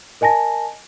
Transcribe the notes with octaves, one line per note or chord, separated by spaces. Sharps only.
A#4 D#5 G#5 A5 A#6